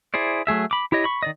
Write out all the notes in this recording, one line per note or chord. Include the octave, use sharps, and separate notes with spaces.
E4 G#4 C5 D5
F#3 A3 G#4 E5
B5 D6
E4 G4 C#5 D#5
B5 C#6
D#3 D5 D#5